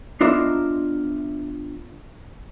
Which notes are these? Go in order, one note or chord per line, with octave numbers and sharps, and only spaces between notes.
B3 D4 F4 A#4 D#5 E5